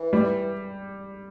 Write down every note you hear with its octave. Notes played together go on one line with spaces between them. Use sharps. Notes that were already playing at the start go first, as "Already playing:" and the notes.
Already playing: E3
G3